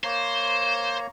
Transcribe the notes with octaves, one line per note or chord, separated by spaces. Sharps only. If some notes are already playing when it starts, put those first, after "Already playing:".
A#3 C5 C#5 A#5